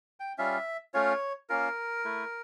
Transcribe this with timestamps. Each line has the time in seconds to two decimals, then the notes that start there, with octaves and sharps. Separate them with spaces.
0.20 G5
0.38 G3 C#4 F4 E5
0.94 A3 C#4 F4 C#5
1.49 A#3 C#4 F4 A#4
2.05 A3 E4